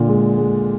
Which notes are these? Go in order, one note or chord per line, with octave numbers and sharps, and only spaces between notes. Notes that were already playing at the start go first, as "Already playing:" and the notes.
Already playing: A#2 D3
G#3
G#3